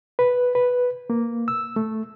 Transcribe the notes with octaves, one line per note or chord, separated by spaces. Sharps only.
B4
B4
A#3
E6
A3